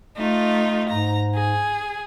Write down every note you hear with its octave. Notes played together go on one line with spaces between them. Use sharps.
A3 D#4 F4
G#2 A#5
G#4